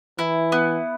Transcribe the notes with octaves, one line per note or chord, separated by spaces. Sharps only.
E3 E4
B3